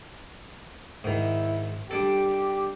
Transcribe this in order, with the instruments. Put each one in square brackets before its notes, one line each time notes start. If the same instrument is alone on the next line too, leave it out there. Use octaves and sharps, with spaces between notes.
[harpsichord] G#2 D#3 [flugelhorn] E4
[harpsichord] G3 D4 A4 [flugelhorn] G4